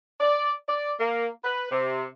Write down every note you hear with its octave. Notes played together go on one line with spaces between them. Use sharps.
D5
D5
A#3
B4
C3